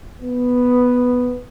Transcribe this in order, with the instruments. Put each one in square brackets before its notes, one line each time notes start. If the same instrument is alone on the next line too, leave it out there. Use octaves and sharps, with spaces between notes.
[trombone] B3